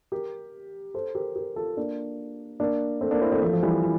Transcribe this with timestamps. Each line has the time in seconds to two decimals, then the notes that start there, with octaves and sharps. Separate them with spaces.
0.12 G4 A#4
0.94 A4 C5
1.15 G4 A#4
1.35 G4 A#4
1.56 F4 A4
1.77 A#3 D4
2.60 A#3 D4
3.01 A3 C4
3.11 A#3 D4
3.21 C4 E4
3.32 A3 C4
3.42 F3 A3
3.53 F3
3.63 E3 G3
3.83 E3